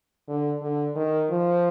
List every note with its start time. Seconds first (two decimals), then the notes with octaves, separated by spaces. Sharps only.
0.28 D3
0.62 D3
0.96 D#3
1.30 F3